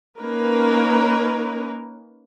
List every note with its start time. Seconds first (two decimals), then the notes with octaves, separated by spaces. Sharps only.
0.20 A#3 C#4 D#4 A#4 B4